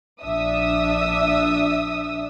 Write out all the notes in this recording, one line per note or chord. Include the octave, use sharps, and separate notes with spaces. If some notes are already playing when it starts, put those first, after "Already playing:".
A#1 D4 E5 D#6 E6